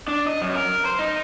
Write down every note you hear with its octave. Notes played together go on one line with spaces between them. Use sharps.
D4
D#5
F#2
A#4
C5
D#4